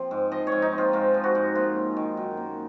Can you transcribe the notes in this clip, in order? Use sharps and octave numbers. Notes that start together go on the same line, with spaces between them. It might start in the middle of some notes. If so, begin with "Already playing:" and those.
Already playing: F3 C4
G#2
F3 D#5
C#5
G#2
D#4
C4
F4
G#2 F4
F3
F#4
G#2
A#3 F4
C#4
D#3
F#2
A#3